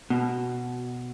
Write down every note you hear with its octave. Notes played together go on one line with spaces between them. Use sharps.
B2